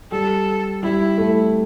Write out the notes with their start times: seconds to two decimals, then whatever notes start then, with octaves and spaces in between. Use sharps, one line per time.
0.12 G3 A4
0.83 G3 E4
1.18 A3